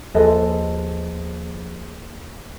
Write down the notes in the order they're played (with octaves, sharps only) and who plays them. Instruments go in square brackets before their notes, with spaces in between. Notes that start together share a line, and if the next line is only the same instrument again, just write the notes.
[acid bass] D#2 [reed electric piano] F3 G#4 C5 [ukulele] A4 B4 D#5